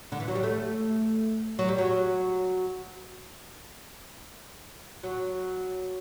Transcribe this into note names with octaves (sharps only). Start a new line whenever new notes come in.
D3
E3
F#3
G3
A3
F#3
G3
F#3
F#3